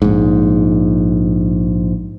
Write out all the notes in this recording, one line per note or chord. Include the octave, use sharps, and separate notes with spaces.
A#1 G#2